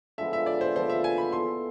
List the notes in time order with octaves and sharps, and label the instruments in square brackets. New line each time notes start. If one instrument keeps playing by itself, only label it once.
[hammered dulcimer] D3 F3 G#3 B3 [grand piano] E5
[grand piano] E5
D5
C5
[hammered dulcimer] D3 F3 G#3 B3 [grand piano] C5
[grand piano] E5
G#5
B5
[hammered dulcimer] B3 E4 A4 [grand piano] C6